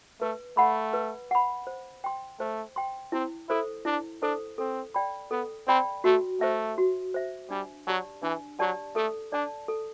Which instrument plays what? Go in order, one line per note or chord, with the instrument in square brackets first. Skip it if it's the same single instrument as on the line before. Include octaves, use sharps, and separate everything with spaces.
[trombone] A3 [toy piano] B4
[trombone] A3 [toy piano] F#5 B5
[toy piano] B4
F#5 B5
C5
G5 C6
[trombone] A3 [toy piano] C5
[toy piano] G5 C6
[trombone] C4 [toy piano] E4
[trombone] E4 [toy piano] A4 C5
[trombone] D4 [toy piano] E4
[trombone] D4 [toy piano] A4 C5
[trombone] C4 [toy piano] A4
[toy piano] D5 G5 B5
[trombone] B3 [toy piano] A4
[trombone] C4 [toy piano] D5 G5 B5
[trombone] A3 [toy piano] F#4
[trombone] A3 [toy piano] C5 E5
[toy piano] F#4
C5 E5
[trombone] G3 [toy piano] D4
[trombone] F#3 [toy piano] G4 D5 A5
[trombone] E3 [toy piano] D4
[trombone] F#3 [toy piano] G4 D5 A5
[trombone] A3 [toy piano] A4
[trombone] D4 [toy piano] D5 A5
[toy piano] A4